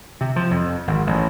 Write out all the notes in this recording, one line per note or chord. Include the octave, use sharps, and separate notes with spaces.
C3
F3
F2
G#1
A1